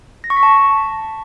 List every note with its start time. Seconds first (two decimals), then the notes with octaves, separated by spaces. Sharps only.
0.24 A#6
0.30 C#6
0.37 B6
0.43 A5